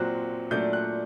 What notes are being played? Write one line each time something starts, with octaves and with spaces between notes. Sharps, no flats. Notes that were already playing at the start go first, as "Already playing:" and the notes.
Already playing: A#2 F#3 C4 F#6
A#2 F#3 A3 D4 G6
F#6